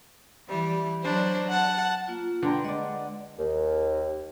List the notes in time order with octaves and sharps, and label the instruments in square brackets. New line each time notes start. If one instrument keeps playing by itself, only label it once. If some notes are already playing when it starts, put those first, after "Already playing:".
[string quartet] E3 G3
F#3 D4 C5
F#5 A5
[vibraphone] A#3 F4
[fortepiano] D3 [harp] B4 G5 A#5 [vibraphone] C6
[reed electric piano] G#3 [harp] D5 F#5 [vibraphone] D#5
[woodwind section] D#2